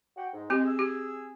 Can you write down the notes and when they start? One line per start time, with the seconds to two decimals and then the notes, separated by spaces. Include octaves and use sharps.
0.17 F#4 F#5 G5
0.33 G#2
0.50 G#3 C4 G4
0.64 G#4 E6
0.79 G4